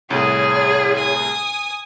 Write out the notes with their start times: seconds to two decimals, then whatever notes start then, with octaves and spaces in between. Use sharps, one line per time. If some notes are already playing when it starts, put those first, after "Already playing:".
0.11 C2 A2 G#4 C#5
0.95 G#5 D#6